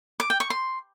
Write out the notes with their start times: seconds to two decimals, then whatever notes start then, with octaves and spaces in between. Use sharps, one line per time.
0.20 D6
0.30 G5
0.40 C#6
0.50 C6